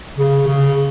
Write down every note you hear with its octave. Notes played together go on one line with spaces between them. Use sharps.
C#3
C#3